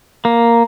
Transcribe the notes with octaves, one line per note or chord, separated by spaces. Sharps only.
A#3